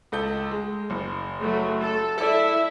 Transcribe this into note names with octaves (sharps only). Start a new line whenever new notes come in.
C#2 A4 G6
G#3
F#1
F#3 A3
A4
E4 A4 D5 E5